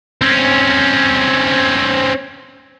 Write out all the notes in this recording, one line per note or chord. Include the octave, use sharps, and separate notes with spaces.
C4 C#4